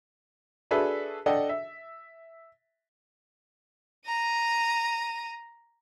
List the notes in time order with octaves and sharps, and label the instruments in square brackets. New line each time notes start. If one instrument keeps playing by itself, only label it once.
[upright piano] D4 F#4 G#4 A4 B4 E5
D4 A4 D5 D#5 F#5 G5
E5
[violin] A#5 D#7